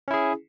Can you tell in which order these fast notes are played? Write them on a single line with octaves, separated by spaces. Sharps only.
C#4 E4 G#4